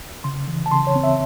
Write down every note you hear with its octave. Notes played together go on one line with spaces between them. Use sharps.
C#3 C6
E3
A5
C#3 C6
C#5
C4
E5